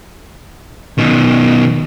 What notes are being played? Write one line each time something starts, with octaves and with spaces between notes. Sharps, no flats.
B2 D#3